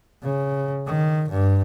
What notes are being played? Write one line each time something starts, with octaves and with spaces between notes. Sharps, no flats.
C#3
D#3
G2